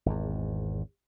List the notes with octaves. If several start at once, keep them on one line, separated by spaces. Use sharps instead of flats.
G#1 E2